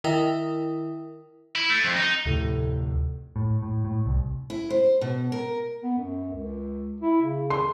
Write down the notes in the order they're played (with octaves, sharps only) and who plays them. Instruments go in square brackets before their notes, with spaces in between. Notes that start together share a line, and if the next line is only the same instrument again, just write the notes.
[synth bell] D#3 E4 A#4 E5 G5 D#6
[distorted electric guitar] E4
A3
F2
D#4
[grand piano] F1 A2 [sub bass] D2
[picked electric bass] A2
A2
A2
C2
[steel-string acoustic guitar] E4
C5
B2
A#4
[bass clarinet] B3
F#2
C#2
E4
C#3
[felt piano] C6